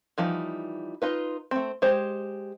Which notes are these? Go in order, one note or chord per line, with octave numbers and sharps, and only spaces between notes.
E3 F3 G3 D#4
D#4 F4 B4
A3 C4
G#3 G4 C5